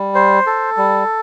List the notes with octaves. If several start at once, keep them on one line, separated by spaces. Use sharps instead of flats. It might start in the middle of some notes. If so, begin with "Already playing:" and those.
Already playing: G3
C5
A4
G3